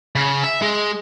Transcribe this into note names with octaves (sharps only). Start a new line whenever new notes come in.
C#3
E5
G#3